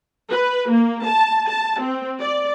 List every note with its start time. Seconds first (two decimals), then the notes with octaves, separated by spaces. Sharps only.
0.30 B4
0.70 A#3
1.04 A5
1.48 A5
1.80 C4
2.20 D5